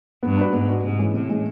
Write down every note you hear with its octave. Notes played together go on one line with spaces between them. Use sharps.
G2 B3
D4 F#4 B4
G#2 B3
D4 F#4 B4
G#2 C3
E3 G#3 C#4
A2 C3
E3 G#3 C#4